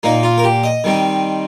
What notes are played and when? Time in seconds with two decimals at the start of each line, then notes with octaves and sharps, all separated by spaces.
0.03 A#2 A#3 D#4
0.23 F4
0.38 A#4
0.44 G4
0.64 D#5
0.84 D#3 G3 C4